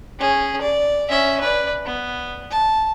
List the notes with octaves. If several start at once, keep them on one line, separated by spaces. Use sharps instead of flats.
C#4 G#4
D5
C#4 E5
B4 D5
B3
A5